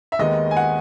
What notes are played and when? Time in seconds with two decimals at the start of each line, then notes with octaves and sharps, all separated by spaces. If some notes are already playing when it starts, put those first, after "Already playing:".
0.12 E5
0.19 D#2 D#3 G#3 B3 D#5
0.51 G#5
0.57 F#5